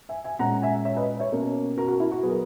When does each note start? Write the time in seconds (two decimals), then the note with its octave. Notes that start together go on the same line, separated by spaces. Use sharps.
0.09 E5 G#5
0.24 E5 G#5
0.39 A#2 G#3 C#4 F#5 A#5
0.62 E5 G#5
0.85 C#5 E5
0.97 B4 D#5
1.19 C#5 E5
1.32 B2 A#3 C#4
1.78 F#4 A#4
1.88 F#4
2.00 E4
2.12 F#4
2.23 B2 F#3 B3 G#4
2.30 A#4